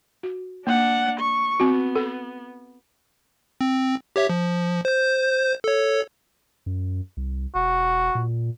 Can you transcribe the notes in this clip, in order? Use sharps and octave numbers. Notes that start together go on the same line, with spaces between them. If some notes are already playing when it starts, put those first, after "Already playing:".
F#4
A#3 D4 F#5
C#6
B3 C4 F#4
A4
C4
G4 C#5 E5
F3
C5 G6
A4 C#5
F#2
C2
E1 F#4
A#2